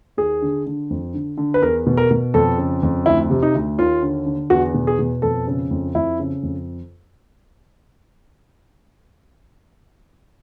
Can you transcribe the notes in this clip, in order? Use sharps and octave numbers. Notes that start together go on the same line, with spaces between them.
D#2 G#4
D3
D3
F2
D3
D3
B4
E2 A#4
B2
A#4
B2
F2 A4
C#3
F2
D2 E4
C3
D#4
D2
D#2 F4
D3
D3
E2 F#4
B2
G#4
B2
F2 A4
C#3
F2
F2 E4
C#3
F2